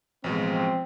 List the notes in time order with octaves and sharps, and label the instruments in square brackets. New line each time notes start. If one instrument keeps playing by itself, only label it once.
[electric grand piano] A1 B2 G#3 [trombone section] F3 C4